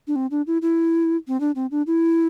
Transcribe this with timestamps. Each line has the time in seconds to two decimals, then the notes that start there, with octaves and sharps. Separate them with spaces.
0.07 D4
0.16 C4
0.31 D4
0.47 E4
0.62 E4
1.28 C4
1.40 D4
1.55 C4
1.71 D4
1.87 E4